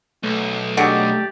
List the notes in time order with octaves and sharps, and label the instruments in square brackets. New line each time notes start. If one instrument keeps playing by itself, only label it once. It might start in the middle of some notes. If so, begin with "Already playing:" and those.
[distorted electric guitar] B1 [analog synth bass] A3
[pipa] D3 F#3 G#3 [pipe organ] G4 D5